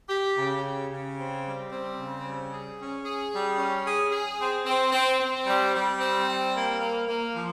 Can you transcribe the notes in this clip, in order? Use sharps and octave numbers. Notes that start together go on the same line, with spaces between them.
G4
C#3
G4
C#3
C4
G3
C4
C#3
G3
G#4
C#4
G#4
G3
C#4
G#4
G#4
C4
C4
C4
C4
G3
G3
C4
G3
A#3
A#3
A#3
F3